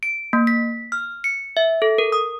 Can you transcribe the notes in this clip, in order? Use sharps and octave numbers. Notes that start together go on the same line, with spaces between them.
D7
A#3
B6
F6
C#7
E5
A4
A#4
D#6